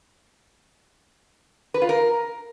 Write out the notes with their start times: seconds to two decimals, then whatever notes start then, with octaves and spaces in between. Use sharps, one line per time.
1.74 B4
1.82 F4
1.89 A#4